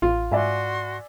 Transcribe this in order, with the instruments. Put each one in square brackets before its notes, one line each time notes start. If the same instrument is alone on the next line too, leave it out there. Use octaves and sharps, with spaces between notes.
[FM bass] A1 [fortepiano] F4
[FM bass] G#2 [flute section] F#4 C6 [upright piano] D5 E5 G#5